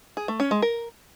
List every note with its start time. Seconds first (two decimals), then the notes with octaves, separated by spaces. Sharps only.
0.17 G#4
0.28 A3
0.40 C#4
0.51 G#3
0.62 A#4